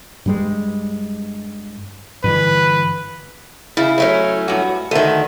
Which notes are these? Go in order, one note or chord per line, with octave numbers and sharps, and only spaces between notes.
G2 G3 G#3
G2 D3 E3 B4
C#3 E4
F#3 A3 C#4
G2 F#4
D2 D#3 A4 E5